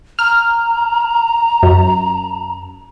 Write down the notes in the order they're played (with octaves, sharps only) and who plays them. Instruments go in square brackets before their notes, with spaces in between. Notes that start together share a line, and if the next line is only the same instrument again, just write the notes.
[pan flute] A#5 [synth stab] F6
[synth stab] F#2